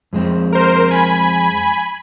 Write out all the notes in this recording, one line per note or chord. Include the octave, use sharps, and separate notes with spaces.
F2 G#3 C4
A#4 C5
G#5 B5